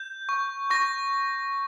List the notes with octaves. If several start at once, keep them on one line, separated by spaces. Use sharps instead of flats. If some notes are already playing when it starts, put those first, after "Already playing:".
Already playing: G6
C#6
C#6 A#6